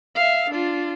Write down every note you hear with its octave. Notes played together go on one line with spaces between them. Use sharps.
E5 F5
D4 F4